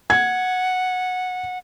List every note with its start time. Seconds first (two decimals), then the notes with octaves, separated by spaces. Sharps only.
0.10 F#5 G#6